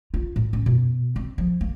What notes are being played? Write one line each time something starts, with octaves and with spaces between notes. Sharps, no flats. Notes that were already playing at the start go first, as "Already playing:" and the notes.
F4
A2
C#4
B2
C4
F3
A#3